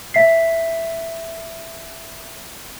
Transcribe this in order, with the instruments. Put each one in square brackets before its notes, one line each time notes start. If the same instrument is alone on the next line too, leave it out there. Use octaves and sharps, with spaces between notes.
[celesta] E5 B6 C7